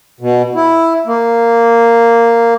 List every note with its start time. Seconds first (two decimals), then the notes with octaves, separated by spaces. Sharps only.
0.21 B2
0.55 E4
1.06 A#3